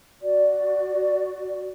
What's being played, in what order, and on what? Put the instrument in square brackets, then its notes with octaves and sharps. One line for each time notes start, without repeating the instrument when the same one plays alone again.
[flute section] F#4 D5